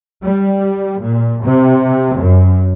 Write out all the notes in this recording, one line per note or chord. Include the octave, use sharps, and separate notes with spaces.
G3
A#2
C3
F#2